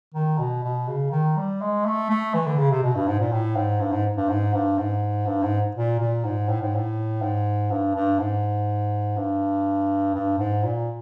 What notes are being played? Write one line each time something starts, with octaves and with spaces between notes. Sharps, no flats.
D#3
B2
B2
C#3
D#3
G3
G#3
A3
A3
E3
D3
C#3
C3
B2
G2
G#2
A#2
A2
G#2
G2
G#2
G2
G#2
G2
G#2
G2
G#2
A#2
A#2
G#2
A2
G#2
A2
G#2
G2
G2
G#2
G2
G2
G#2
A#2